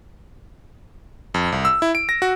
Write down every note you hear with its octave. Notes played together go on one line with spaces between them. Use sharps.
F2
C2
E6
E4
D7
A#6
F#4